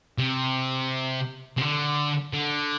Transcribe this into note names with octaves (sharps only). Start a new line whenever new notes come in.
C3
C3
D3
D3